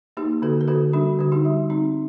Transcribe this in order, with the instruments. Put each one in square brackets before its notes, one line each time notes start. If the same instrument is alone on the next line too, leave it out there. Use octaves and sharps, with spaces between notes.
[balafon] A#3 D#4 G4
D3 F#4 A4
A#4
D3 F#4 A4
G3 D4 F#4
D3 F#4
D#4 G4
G3
C4 D#4